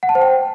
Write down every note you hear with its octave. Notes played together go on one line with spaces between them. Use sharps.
F#5
A5
C5
G5